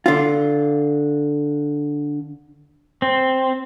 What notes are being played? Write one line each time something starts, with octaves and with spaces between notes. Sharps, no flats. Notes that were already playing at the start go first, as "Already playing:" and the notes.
D3 F4
C4